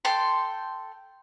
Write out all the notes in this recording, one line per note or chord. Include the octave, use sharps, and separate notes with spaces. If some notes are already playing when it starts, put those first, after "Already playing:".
A4 G5 C6